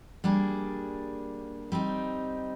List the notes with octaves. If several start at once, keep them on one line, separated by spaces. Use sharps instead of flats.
G3 A#3 D4 G#4
G3 C4 D#4